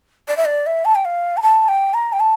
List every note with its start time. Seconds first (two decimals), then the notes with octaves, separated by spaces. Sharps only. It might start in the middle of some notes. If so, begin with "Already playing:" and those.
0.28 D5
0.37 E5
0.45 D5
0.66 E5
0.85 A5
0.95 G5
1.05 F5
1.37 A#5
1.42 A5
1.68 G5
1.94 A#5
2.13 G5
2.20 A5